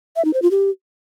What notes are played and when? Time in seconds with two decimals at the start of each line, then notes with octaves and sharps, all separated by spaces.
0.16 E5
0.25 D#4
0.34 C5
0.42 F4
0.51 G4